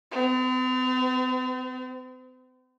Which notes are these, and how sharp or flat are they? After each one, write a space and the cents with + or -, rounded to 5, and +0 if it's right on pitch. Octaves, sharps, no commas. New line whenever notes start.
C4 -45